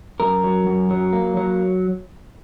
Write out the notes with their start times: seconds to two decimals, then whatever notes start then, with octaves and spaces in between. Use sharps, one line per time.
0.20 F#2 A#4
0.44 F#3
0.67 F#2
0.90 F#3
1.13 A#3
1.37 F#3